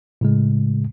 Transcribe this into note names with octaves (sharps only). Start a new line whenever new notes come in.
A2 C#3 G#3